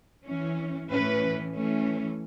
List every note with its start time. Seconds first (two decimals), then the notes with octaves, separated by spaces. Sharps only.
0.25 E3 C#4
0.89 A2 E3 C#4 B4
1.54 E3 A3 C#4